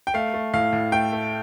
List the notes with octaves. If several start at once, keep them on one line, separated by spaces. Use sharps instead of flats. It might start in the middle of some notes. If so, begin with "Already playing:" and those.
G5
A3 F5
A3
A2 F5
A2
A3 G5
A3